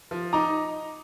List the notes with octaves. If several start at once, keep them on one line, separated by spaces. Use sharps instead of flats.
F3
D#4 A#5 D6